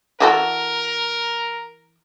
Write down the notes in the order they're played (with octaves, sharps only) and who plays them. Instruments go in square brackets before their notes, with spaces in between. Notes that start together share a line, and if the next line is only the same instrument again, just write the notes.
[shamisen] E3 F#4 A4 [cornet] A#4